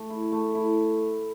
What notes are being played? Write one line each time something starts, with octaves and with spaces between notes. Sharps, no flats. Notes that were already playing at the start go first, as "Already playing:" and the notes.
Already playing: A3
E4
A3
E4